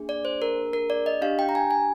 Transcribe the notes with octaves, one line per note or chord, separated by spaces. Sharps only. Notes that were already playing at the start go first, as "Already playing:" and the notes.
Already playing: A#3 D4 G#4
D5
C5
A#4
A#4
D5
D#5
D4 G4 F5
G5
A#5
G#5
G#5